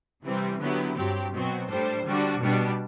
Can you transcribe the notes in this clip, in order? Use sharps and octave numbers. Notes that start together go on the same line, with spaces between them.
C3 E3 G3 C4
D3 F#3 B3 E4 G4
G2 F#3 C4 G4
B2 F#3 C4 F#4
A2 G3 D4 A4 C5
D3 G3 D4 F#4
B2 G3 D4